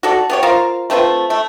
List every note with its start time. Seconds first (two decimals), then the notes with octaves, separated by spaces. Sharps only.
0.03 F#4 A4 D5
0.30 B3 G4 C#5
0.43 F4 A#4 C5 F5
0.90 A3 C4 F4 B4
1.30 A3